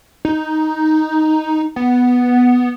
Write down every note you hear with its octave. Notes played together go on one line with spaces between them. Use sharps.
D#4
B3